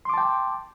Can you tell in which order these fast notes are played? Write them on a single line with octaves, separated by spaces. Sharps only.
C6 D6 A5 G5